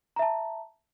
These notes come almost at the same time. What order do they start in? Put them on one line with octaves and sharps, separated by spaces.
A#5 E5 A5